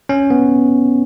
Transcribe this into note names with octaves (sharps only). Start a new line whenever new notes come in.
C#4
B3